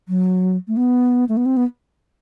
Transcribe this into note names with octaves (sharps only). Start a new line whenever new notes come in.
F#3
A3
B3
A3
B3
C4
B3